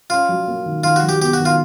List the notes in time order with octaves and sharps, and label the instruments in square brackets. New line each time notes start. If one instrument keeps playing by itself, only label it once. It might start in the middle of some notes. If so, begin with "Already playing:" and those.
[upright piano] C#4 [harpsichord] F4
[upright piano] F#3
A#3
D#3
[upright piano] D#3 [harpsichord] F4
[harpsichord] F#4
[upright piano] F#3
[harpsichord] G4
[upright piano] B3 [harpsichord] G4
[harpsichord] F#4
[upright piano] D#3
[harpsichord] F4